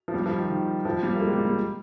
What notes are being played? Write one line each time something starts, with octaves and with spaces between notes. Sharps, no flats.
F3
G3
F3
D#3
D#3
F3
G3
A#3
G#3
G3
G3